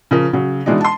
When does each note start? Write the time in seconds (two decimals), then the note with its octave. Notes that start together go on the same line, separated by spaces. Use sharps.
0.11 C#3 F3 A#4
0.33 C#3 F#3
0.66 B2 E3 G#3 D4 D#4
0.81 A5 C6